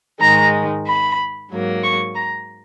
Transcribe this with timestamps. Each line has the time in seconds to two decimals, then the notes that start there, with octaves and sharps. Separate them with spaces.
0.20 G#2 D#3 G#3 A#5
0.86 B5
1.50 G#2 F#3 A#3
1.83 C#6
2.15 A#5